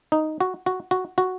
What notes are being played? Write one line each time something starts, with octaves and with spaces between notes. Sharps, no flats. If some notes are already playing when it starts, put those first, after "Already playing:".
D#4
F#4
F#4
F#4
F#4